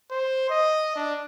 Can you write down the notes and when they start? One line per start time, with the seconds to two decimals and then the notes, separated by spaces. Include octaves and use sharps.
0.11 C5
0.50 D#5
0.96 D4